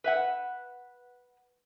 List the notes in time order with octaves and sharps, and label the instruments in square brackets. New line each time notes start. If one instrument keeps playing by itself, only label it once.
[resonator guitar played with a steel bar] B4 E5 F#5